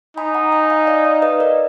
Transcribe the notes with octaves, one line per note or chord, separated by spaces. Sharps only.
D#4 G#5 B5
F#5 A#5
G#5 B5
F5 G#5
D5 F5
D5 F5
B4 D#5
A#4 D5